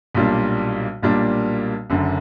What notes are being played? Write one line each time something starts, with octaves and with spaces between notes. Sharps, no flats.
B1 A#2 G3 A#3 D4
B1 A#2 G3 A#3 D4
F#1 F#2 D3